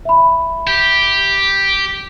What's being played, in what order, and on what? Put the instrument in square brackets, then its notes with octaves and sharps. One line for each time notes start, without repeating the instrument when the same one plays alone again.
[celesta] E5 B5
[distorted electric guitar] G4